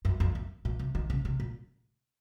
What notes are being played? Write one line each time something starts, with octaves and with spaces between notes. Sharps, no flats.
F#2
F2
F#2
A#2
C3
D#3
C#3
C3
A#2